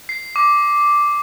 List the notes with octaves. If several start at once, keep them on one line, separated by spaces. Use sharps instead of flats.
C7
D6